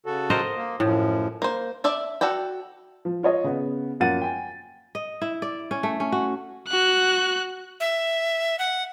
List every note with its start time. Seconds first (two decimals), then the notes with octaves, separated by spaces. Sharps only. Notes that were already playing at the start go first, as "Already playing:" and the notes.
0.06 C#3 F#4 A4
0.30 A#4 C5 D#5
0.56 A#3
0.80 F#2 A2 F3
1.42 A#3 C5
1.84 D5 E5 A5
2.21 F#4 A4 D5 G5
3.05 F3
3.23 F4 C#5 D#5
3.44 C#3 B3
4.00 F#2 F3 A#3 F#5 A6 D#7
4.22 G5 G#5
4.95 D#5
5.22 E4
5.42 D5
5.71 C#4
5.83 A3
6.00 C#4
6.12 F#4
6.68 F#4 F#6
7.80 E5
8.59 F#5